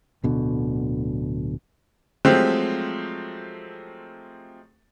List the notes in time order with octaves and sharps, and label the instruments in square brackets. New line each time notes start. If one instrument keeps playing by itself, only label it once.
[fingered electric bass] D1 B2 D3
[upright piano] F3 F#3 G#3 A3 C4 G4